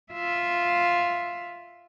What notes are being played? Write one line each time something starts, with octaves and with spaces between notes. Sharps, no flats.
F4 E5